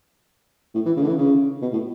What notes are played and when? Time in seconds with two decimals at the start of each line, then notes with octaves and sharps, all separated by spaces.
0.75 A2
0.86 E3
0.97 C#3
1.02 D3
1.07 E3
1.18 C#3
1.62 B2
1.72 A2